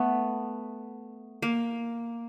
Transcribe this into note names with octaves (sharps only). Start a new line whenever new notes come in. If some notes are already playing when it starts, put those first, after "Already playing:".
Already playing: A3 B3
A#3